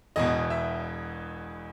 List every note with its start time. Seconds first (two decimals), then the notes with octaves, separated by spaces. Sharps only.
0.16 E1 E2 B2 D#5
0.50 E5